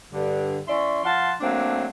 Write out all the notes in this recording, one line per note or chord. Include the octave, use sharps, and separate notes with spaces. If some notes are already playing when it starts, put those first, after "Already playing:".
G2 D3
E3 C#4 D5 E5 C6
F3 F5 F#5 A5 C6
F#3 A3 A#3 C4 D4